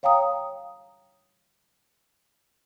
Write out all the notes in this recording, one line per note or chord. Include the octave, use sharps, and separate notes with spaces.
C#5 F5 G5 A#5 D#6